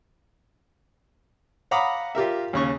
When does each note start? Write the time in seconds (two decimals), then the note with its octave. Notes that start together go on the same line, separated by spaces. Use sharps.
1.71 F5 F#5 A#5 B5 D6 D#6
2.15 F4 G4 A#4 E5
2.53 D#2 C#3 C#6